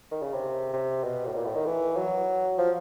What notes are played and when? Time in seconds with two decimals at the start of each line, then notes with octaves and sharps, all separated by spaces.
0.12 D#3
0.22 C#3
0.33 C3
0.73 C3
1.04 B2
1.26 A2
1.35 A#2
1.45 A2
1.55 D#3
1.66 E3
1.97 F#3
2.58 F3